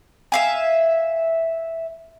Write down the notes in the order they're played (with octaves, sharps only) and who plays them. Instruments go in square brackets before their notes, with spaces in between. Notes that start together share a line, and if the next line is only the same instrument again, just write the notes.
[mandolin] E5 F5 G#5